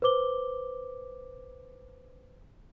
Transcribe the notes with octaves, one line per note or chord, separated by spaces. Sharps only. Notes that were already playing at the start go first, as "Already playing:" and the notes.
B4 C5 D6 G7